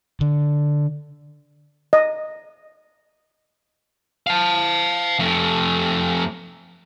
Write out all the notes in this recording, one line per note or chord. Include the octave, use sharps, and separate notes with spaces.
D3
D#5
F5 A5
F2 A3